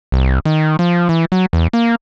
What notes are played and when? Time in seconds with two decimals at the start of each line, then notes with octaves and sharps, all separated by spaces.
0.12 C2
0.45 D#3
0.79 F3
1.09 E3
1.32 F#3
1.53 E2
1.73 A#3